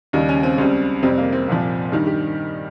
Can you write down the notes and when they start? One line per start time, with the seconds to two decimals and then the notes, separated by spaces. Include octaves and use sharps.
0.13 D#2 C#3 G3 D#4
0.29 C#4
0.43 C4
0.58 C#2 C#3 G3 C4
1.03 F2 C3 G3 C4
1.18 A#3
1.33 C4
1.48 C2 A#2 F3
1.92 G2 D#3 G3 D#4
2.07 G4